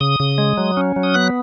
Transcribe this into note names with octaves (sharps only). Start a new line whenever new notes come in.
C#3 D#6
C#3
G#3
F#3
C#4
F#3
D#6
B3 F#6